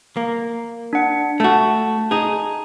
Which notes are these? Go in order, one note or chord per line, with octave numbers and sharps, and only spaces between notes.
A#3
D4 F#5
A3 F#4 A5
D#4 G#4